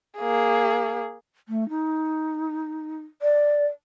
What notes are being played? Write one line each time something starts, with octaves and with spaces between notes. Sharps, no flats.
A#3 G#4
A3
D#4
D5